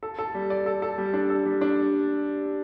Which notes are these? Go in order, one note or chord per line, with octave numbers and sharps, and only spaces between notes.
A4
A4
G3
D5
A4
A4
G3
D4
A4
G3
D4